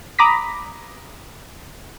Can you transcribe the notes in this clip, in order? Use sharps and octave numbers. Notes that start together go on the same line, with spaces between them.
A#5 B5 D6 D#6 A#6 B6